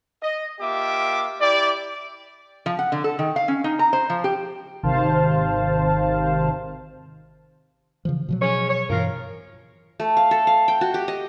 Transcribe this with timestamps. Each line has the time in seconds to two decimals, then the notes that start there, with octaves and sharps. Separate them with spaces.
0.23 D#5
0.60 A#3 F4 G4 E5 D6
1.41 E4 G4 D5
2.66 F3
2.79 F#5
2.92 D3
3.04 A4
3.19 D#3
3.36 F5
3.48 C#4
3.64 D#4
3.79 A#5
3.93 C5
4.10 F3
4.24 G4
4.83 G#1 C3 D#3 C5 F5 A5
8.05 C#3 E3 F3
8.28 B2 F3 F#3
8.42 G#3 C#4 C#5
8.70 C#5
8.90 G2 B2 E3 F3 F4 A#4
10.00 A3
10.17 F5
10.31 A4
10.47 F5
10.68 G5
10.81 F#4
10.94 G4
11.08 D#5